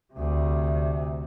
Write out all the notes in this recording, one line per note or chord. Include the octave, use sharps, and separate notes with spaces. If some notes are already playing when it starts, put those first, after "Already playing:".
D2 C3